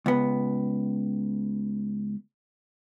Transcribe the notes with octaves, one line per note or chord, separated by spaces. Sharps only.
C#2 B3